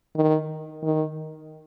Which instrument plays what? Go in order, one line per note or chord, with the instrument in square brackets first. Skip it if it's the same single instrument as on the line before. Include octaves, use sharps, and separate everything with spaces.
[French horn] D#3
D#3